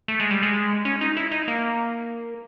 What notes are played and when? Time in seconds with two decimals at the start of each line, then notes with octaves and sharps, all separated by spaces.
0.08 A3
0.20 G#3
0.31 G3
0.43 G#3
0.85 C#4
1.01 D#4
1.17 E4
1.31 D#4
1.48 A#3